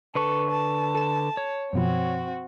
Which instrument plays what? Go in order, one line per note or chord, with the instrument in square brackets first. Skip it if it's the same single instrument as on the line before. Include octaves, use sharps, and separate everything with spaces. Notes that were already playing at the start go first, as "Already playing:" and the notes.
[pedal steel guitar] D3 B4 C#6 [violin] A4
[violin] A5
[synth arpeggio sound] A4 E7
[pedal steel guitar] C#5
[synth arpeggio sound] F#2 B2 F3 [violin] C4 F#4